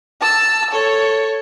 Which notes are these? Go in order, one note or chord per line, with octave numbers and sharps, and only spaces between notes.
A5 E6
A4 C#5